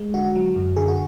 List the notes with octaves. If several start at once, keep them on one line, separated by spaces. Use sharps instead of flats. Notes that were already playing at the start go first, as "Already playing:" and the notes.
Already playing: G#3
D3 F#4
F#3
F#2
D3 G#4
F#4